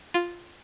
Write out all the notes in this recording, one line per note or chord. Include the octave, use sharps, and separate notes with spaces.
F4